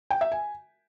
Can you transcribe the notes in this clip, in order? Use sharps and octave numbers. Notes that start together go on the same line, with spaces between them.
G5
E5
G#5